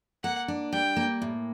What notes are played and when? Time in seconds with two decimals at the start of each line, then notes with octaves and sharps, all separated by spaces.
0.23 A#3 F#5
0.48 D4
0.72 G3 G5
0.96 A#3
1.22 A2